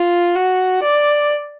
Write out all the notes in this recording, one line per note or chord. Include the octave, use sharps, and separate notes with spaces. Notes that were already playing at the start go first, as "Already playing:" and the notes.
Already playing: F4
F#4
D5